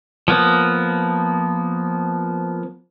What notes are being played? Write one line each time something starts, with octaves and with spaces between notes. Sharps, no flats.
F3 A#3 B3